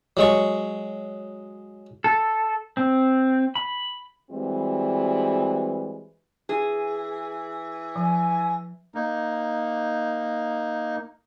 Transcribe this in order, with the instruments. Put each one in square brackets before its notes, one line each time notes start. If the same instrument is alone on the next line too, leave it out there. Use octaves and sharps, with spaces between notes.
[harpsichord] F#3 G#3 C#6
[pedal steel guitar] A4
C4
B5
[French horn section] E3 G3 G#3 C4 F#4 B4
[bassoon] E3 [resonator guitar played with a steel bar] G#4
[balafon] F3 [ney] G#5
[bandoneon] A#3 D#4